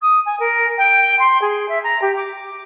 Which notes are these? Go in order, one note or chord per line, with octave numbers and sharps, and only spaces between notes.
D#6
G#5
A#4
G5
C6
G#4
E5
A#5
G4
D6